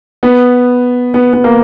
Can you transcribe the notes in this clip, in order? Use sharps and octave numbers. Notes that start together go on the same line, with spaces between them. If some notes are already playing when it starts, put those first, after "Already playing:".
B3
B3
B3
A#3